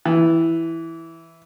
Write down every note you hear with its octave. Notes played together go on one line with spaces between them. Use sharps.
E3